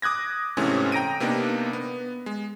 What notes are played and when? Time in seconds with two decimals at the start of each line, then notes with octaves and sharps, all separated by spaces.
0.02 D6 D#6 F#6 G#6 A#6
0.57 G#2 C3 E3 A3 C4 C#4
0.92 G5 A#5 A#6 D7 D#7
1.20 C3 A#3 B3 D4 D#4
1.73 B3
2.26 G#3